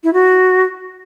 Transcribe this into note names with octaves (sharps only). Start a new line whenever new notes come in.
E4
F#4